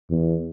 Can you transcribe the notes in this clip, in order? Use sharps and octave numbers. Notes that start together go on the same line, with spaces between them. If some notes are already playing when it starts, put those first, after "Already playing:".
E2